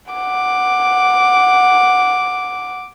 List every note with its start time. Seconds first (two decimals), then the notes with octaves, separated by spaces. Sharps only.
0.12 F#5 D6